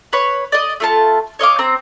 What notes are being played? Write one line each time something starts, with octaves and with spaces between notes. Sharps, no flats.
B4 C#5
D5 D#5
A3 F4 A5
C#5 D#5 F5 D6
C4 A#5